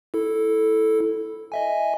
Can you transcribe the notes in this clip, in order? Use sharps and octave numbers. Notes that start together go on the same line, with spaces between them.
E4 A4
D#5 E5 G#5